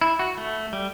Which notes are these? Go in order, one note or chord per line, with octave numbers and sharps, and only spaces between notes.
E4
F#4
A3
G3